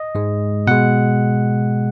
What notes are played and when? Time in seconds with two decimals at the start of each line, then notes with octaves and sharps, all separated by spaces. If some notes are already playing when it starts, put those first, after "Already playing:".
Already playing: D#5
0.15 G#2 G#3
0.67 B2 G#3 F#5